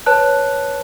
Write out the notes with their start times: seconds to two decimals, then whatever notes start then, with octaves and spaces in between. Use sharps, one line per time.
0.06 B4 C#5 A5 F#6